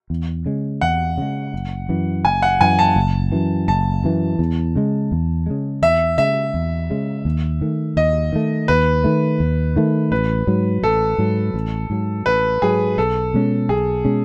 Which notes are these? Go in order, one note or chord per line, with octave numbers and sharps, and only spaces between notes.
E2
C#3 G#3
E2 F#5
C#3 G#3
F#1
F#2 E3
F#1 G#5
F#5
F#2 E3 G#5
A5
F#1
F#2 E3
F#1 A5
F#2 E3
E2
C#3 G#3
E2
C#3 G#3
E2 E5
C#3 G#3 E5
E2
C#3 G#3
D#2
D#3 A3
D#2 D#5
D#3 A3
D#2 B4
D#3 A3
D#2
D#3 A3
A1 B4
G#2 F#3
A1 A4
G#2 F#3
A1
G#2 F#3
A1 B4
G#2 F#3 G#4
B1 A4
B2 G#3 C#4
B1 G#4
B2 G#3 C#4